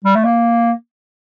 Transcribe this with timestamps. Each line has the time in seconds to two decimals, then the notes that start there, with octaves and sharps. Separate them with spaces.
0.04 G3
0.15 A3
0.24 A#3